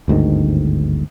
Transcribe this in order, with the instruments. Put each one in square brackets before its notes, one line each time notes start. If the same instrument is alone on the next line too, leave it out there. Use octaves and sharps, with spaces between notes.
[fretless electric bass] G1 D2 G#2 D#3